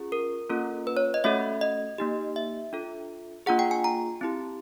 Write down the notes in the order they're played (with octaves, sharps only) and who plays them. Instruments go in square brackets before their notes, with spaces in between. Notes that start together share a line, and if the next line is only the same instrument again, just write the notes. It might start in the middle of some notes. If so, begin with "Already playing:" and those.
Already playing: [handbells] C#4 F4 G#4
A#4
A#3 C#4 F4 A4
B4
C#5
D#5
A3 C#4 F#4 A4 E5
D#5
A#3 D#4 G4
E5
D4 F4 A4
A#3 D4 F4 G#4 F#5
G5
G#5
A#5
C4 E4 G4